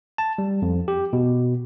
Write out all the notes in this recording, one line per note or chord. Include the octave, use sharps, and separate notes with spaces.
A5
G3
F2
G4
B2